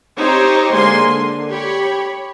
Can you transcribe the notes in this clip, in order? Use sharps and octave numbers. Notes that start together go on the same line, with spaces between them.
C4 D#4 G4 C5 C#5 A#5
D3 G#3 A#3 G#5 C6
D3
G4 C#5 B5